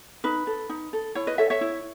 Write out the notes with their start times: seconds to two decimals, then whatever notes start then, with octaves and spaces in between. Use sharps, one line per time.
0.24 D#4 B4
0.47 A4
0.69 D#4
0.93 A4
1.15 E4 C#5
1.27 B4 D#5
1.38 A4 C#5 E5
1.50 C#5 E5
1.61 E4